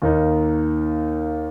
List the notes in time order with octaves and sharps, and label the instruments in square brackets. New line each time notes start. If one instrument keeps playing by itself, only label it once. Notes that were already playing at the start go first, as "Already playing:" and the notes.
[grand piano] D#2 D#3 A#3 D#4